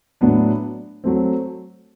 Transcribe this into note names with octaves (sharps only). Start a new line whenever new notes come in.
A2 F#3 B3 D4
F#3 A3 C4